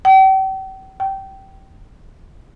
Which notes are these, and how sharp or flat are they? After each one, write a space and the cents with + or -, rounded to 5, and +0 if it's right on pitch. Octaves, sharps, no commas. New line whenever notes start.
G5 -40
G5 -20